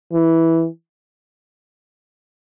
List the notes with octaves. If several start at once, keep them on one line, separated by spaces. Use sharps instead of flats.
E3